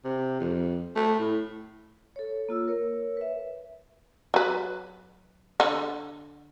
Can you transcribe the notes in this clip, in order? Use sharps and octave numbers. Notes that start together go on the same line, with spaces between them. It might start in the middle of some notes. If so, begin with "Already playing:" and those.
C3
F2
A3
A2
A4 C#5
A#3 F4 E6
A#4 C#5
B4 E5
F#3 B4
D3